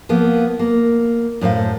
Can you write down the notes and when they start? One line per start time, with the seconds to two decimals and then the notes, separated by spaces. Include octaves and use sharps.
0.09 F3 A#3 B3
0.59 A#3
1.41 F#2 A2 C5 F5